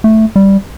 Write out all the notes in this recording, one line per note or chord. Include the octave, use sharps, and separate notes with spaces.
A3
G3